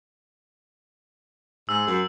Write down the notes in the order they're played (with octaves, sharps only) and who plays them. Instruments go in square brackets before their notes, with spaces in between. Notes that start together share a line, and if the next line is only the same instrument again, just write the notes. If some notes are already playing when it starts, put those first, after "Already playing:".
[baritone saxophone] G#2 [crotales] E6
[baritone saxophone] F#2